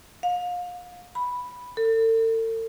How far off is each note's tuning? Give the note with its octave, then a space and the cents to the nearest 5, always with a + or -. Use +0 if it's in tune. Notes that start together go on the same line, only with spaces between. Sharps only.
F5 +35
B5 -5
A4 +40